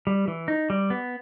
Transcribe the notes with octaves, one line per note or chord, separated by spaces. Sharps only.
G3
E3
D#4
G3
B3